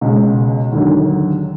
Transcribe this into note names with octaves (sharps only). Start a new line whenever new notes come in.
C#2 B2 G#3
D#2 D3 F#3